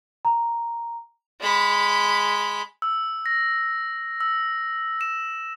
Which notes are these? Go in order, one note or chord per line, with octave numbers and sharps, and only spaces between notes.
A#5
G#3 B5
E6
A#6
E6
E7